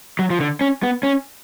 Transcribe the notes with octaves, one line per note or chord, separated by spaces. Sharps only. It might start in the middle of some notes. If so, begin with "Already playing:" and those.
F#3
F3
D3
C#4
B3
C#4